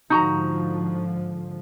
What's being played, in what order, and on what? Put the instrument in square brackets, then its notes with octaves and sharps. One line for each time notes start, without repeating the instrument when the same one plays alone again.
[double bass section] G#2 D3 F3 [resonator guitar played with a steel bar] D#4 F#4 A#5